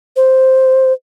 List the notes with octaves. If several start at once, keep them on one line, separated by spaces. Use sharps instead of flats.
C5